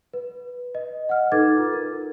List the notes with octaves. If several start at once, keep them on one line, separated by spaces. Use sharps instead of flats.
B4
D#5
F#5 F6
D#4 A4 B4 D6 G#6 A6
F4
A#4